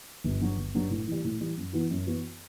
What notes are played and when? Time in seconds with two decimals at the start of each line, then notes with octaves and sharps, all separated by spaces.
0.24 G1
0.41 G2 F#3
0.57 G1
0.75 G2 F#3
0.90 A2
1.07 E3 G3
1.24 A2
1.40 E3 G3
1.57 F#2
1.73 E3 B3 F#4
1.91 F#2
2.06 E3 B3 F#4